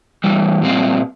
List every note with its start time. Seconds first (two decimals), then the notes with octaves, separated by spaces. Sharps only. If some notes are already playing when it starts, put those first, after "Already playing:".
0.24 E2 C3 E3 G3
0.62 A#2 G3 C4 F4